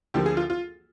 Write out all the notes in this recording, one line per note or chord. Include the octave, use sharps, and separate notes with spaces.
D2 D3 F3 A#3 G4
G#4
F4
F4